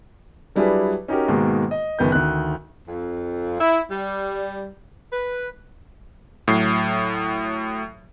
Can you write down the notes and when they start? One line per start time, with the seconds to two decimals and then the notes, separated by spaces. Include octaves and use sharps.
0.56 F#3 G3 D4 E4 G#4 B4
1.08 C#4 D#4 F#4 G4 A#4
1.28 G#2 B2 D#3 G#3 A#3
1.71 D#5
1.99 F#1 D#3 B3 A#4 G6
2.12 D2 D#3 F#6
2.88 F2
3.61 E4
3.91 G3
5.12 B4
6.48 A2 F#3 C7